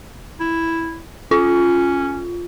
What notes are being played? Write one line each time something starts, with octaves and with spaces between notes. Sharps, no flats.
E4
C#4 F4